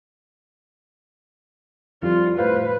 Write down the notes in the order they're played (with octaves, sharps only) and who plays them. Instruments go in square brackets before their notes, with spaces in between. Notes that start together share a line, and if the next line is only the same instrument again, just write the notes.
[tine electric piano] F2 G3 [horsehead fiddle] F4
[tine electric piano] A2 C5 F5 [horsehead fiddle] B4